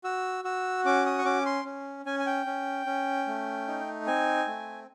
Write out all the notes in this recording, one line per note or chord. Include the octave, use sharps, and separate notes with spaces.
F#4 E6
F#4 E6
C#4 D6
D#6
C#6
C#4 D6
C6
C#4
C#4 G#5
G#5
G5
C#4
C#4
A3
D#4
C4 G#5
A3